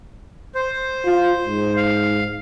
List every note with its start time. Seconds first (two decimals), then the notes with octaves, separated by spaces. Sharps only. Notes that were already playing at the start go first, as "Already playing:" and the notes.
0.55 C5
1.05 F4
1.45 G#2
1.76 F5